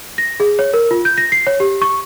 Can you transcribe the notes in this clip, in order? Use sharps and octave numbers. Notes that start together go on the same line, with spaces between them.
A#6
G#4
C#5
A#4
F4
G6
A#6
C7
C#5
G4
C#6